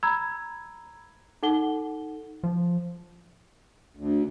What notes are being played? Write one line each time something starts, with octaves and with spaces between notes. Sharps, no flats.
A#5 B5 E6 G#6
D#4 A4 F#5 G7
F3
D2